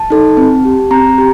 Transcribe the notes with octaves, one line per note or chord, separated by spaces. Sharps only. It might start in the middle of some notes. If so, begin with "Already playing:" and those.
Already playing: A5
D#4 A4
C4
G4
C4 A#5
G4